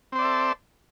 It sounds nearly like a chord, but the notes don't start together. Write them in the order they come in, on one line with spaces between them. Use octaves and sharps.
C4 C5 D5 E5 A4